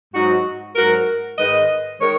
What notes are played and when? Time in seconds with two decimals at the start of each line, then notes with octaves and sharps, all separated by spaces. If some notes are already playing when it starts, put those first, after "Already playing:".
0.14 G#2 F#3 D#4 F#4
0.76 G#2 F#3 F#4 A#4
1.38 G#2 D#3 G#3 B4 D#5
2.00 D#3 G#3 A#4 C#5